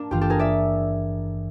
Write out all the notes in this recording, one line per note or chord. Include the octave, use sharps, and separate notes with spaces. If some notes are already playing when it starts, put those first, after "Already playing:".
Already playing: A#3 D4
G#1 G2 E3 F4 G4
G4 A4
G#4 A#4
D5 E5